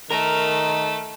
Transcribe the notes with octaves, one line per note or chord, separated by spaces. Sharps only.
D#3 A3 A#4